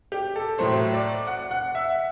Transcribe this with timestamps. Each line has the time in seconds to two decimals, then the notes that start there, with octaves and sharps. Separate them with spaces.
0.12 G4
0.36 A4
0.58 A2 F#3 A3 C5
0.93 D5
1.27 F#5
1.51 F#5
1.75 E5